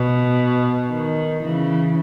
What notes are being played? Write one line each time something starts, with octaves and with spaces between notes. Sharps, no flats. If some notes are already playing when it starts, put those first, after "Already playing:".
Already playing: B2
D#3
C#3 E3